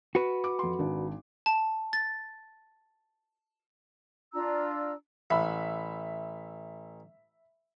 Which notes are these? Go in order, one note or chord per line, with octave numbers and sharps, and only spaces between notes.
F#4 B4 C#7
D6
F2 C6
G#1 D4
A5
A6
D4 F4 A#5 E6
A1 E5 B5